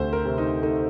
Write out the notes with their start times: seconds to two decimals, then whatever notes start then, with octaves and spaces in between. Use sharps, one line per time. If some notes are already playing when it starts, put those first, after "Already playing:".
Already playing: D2 C3 A3 C5
0.13 A#4
0.25 C3
0.38 D#4
0.62 A3 D#4